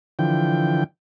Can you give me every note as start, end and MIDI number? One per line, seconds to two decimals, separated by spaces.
0.19 0.84 50
0.19 0.84 52
0.19 0.84 53
0.19 0.84 79